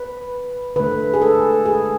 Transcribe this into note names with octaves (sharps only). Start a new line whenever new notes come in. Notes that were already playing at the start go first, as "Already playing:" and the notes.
Already playing: B4
D3 A3 B4
G#4
A4
G#4